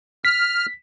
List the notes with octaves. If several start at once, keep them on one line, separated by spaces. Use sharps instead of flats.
F6 B6